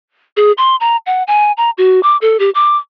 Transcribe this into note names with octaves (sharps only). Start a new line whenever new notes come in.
G#4
C6
A#5
F#5
G#5
A#5
F#4
D6
A4
G4
D6